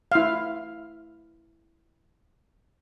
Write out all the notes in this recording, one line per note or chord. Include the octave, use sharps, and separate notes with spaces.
E4 F5